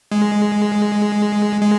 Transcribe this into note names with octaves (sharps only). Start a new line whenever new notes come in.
G#3
G#3